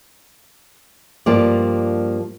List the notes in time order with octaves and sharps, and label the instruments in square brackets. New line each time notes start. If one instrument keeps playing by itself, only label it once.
[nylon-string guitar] G2 F3 A#3 G4 D5